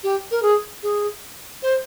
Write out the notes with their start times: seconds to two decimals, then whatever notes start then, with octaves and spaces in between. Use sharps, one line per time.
0.03 G4
0.31 A#4
0.42 G#4
0.83 G#4
1.62 C5